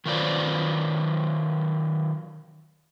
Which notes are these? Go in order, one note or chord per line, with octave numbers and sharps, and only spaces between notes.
D#3 F#3 F4 B4 C5 D5